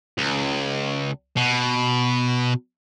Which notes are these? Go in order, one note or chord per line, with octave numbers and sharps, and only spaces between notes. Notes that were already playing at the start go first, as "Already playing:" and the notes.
C#2
B2